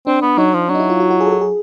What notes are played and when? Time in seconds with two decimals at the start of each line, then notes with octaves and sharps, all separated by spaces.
0.07 C4 D4
0.22 B3
0.38 F#3 D#4
0.54 F3
0.69 F#3 D4
0.75 D#4
0.80 E4
0.90 F4
1.00 F#4
1.11 F#4
1.20 G#4
1.26 A4
1.31 G#4
1.41 G#4